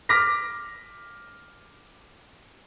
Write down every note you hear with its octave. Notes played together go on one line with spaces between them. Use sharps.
D6 F6 A#6 B6